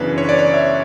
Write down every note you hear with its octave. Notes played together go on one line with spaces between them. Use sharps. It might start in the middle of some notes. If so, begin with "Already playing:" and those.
Already playing: F#2 C#3 E3 B3 D4 B4
C#5
D5
C#5
E5